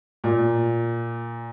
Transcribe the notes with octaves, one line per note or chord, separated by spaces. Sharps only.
A#2